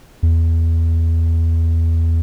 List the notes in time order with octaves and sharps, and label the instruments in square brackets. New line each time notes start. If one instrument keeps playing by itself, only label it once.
[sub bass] E2